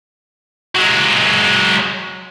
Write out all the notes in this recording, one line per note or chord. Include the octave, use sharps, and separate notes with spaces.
F#3 G#3